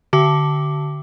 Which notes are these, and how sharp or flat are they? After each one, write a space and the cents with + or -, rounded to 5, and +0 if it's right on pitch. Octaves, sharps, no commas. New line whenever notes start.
D3 +0 F#4 +45 E5 +35